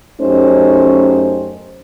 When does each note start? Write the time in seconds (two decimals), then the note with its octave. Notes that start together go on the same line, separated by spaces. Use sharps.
0.21 F#2 A3 C#4 D#4 G4 C5